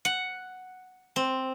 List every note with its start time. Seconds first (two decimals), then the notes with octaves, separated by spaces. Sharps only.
0.05 F#5
1.16 C4